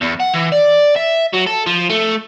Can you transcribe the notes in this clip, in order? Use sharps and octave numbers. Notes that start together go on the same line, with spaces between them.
E2
F#5
E3
D5
E5
F#3
A4
F3
A3